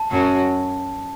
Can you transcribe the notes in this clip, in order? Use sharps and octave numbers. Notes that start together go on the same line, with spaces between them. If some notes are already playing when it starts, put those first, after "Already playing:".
Already playing: A5
F#2 F#3